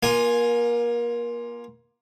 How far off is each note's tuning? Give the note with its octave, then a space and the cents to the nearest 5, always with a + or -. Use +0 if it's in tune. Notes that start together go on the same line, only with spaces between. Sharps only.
A#3 +30 F4 +0 G#5 +0